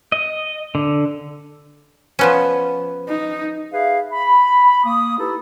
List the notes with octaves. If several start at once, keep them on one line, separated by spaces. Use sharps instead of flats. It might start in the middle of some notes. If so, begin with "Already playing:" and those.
D#5
D3
F3 B3 C#4
D#4
G#4 B4 E5 F5
B5
A#3 D#6
D#4 E4 G4 A4 B4